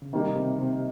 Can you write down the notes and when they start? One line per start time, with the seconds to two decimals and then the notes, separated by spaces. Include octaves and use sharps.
0.02 C#3
0.13 C3 D#3 G3 A#3 D#4
0.36 C3
0.59 C3